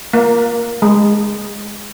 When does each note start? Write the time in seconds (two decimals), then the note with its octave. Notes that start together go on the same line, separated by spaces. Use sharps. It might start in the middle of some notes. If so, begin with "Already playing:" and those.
0.13 A#3
0.82 G#3